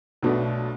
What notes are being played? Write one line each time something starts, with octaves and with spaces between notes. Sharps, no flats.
B1 B2 F#3 A3 D4